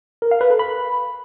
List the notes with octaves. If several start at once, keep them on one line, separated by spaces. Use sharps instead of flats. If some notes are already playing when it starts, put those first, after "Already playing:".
A#4
F5
B4
A4
B5